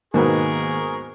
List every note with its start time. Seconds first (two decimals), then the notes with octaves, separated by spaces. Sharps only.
0.14 G#2 B2 D#3 A#3 B3 G#4 A#4 C#6